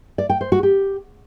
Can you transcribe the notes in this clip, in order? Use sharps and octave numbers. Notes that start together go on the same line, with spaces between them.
D5
G5
C5
F#4
G4